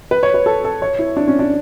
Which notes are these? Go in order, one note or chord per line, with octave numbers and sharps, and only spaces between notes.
B4
C#5
B4
A4
A4
C#5
E4
D4
C#4
D4